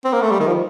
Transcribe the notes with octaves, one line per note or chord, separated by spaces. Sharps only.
C4
A#3
A3
G3
D#3
F3